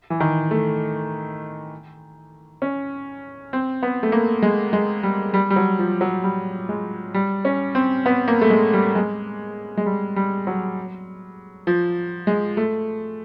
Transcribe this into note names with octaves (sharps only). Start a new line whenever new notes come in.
E3
D#3
A3
C#4
C4
B3
A3
A#3
G#3
G#3
G3
G3
G3
F#3
F3
F#3
G3
G#3
G3
C#4
C4
B3
A#3
A3
G#3
G3
G#3
G#3
G3
G3
F#3
F3
G#3
A3